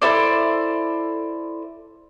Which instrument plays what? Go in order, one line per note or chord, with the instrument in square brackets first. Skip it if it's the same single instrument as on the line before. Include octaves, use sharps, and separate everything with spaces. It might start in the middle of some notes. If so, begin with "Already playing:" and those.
[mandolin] E4 A4 C5 D5